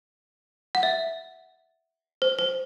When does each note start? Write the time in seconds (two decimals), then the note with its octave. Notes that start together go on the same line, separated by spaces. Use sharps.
0.75 F#5
0.83 E5
2.22 C5
2.39 C5